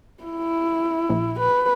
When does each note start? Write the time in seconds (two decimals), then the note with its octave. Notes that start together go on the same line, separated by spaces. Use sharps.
0.23 E4
1.09 A#1
1.39 B4